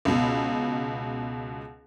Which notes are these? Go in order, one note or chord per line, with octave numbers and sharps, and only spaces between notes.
C#2 B2